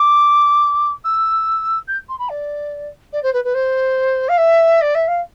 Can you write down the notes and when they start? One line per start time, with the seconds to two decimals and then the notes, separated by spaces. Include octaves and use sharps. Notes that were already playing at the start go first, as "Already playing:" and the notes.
Already playing: D6
1.04 E6
1.87 G6
2.08 C6
2.18 B5
2.29 D5
3.12 D5
3.23 C5
3.33 B4
3.44 B4
3.54 C5
4.28 F5
4.37 E5
4.81 D5
4.94 E5
5.07 F5